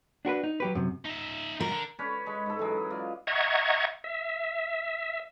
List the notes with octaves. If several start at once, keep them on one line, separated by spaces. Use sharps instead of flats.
D4 F#4 A#4 B4
D#4
F#3 G4 B4
F#2 C3
D#4 E5
G#2 F#3 A#4
D3
C#4 B4 C#5 D5
G#3 B5 C#6
G#2 A4
E3 F#3 G#3
F4 D5
D#5 E5 F#5 A#5 C#6 G#6
E5